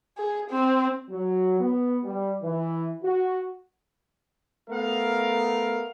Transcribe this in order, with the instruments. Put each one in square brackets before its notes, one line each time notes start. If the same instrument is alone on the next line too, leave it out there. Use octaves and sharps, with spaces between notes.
[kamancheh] G#4
C4
[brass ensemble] F#3
B3
G3
E3
F#4
A3 B3 A#4 F5